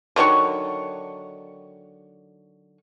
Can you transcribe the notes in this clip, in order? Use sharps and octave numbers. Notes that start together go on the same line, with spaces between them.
D3 D#3 F#3 C#6